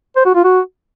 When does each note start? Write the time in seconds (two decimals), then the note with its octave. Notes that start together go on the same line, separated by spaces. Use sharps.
0.16 C5
0.26 F#4
0.35 F4
0.44 F#4